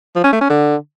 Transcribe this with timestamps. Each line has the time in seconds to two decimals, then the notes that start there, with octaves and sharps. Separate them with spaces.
0.15 F3
0.24 C#4
0.32 A3
0.41 C#4
0.49 D3